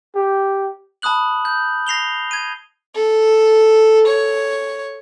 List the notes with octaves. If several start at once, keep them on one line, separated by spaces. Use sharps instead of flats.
G4
A5 B5 D#6 F#6 F#7
G6
A#6 C7 F7 G7
G#6 D#7
A4
C#5